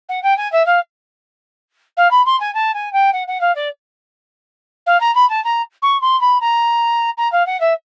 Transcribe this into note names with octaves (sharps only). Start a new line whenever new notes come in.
F#5
G5
G#5
E5
F5
F5
B5
C6
G#5
A5
G#5
G5
F#5
F#5
F5
D5
F5
A#5
B5
A5
A#5
C#6
C6
B5
A#5
A#5
F5
F#5
E5